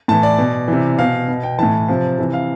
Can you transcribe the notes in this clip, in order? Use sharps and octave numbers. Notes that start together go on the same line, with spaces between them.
A2 E3 A5
D5
B2
C3 E3
B2 F5
B2
G5
A2 E3 A5
C3 F3
C3 E3
F5